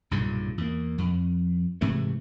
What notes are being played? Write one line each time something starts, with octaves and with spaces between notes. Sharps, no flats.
B1 G2 A#2 C#3
E2 A#3
F2
G#2 C3 E3 A3